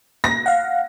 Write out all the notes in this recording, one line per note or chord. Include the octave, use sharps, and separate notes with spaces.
A#6
F5 F#5